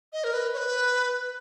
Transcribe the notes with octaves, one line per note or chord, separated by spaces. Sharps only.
D#5
A#4
B4
C#5
B4